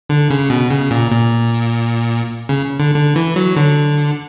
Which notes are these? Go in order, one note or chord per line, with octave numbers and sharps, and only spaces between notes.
D3
C#3
B2
C#3
A#2
A#2
C#3
D3
D3
E3
F#3
D3